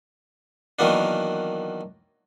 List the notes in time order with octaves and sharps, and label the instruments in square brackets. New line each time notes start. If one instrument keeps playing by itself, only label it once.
[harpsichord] D#3 E3 F#3 A#3 B3 D4